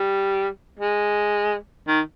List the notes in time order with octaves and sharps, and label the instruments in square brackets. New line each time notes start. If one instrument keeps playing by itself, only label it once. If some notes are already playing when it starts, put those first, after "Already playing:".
Already playing: [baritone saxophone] G3
G#3
D#3